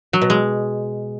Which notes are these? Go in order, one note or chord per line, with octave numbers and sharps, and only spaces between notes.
F#3
B2
G#3